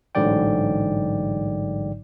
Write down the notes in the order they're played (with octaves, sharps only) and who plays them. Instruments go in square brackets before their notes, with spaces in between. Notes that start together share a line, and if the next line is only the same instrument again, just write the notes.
[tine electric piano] A1 G#2 D3 F#3 D5 G5